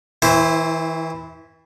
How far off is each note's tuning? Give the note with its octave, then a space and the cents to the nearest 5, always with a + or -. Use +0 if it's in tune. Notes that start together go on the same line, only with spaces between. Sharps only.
E3 -35 E4 +0 C5 +0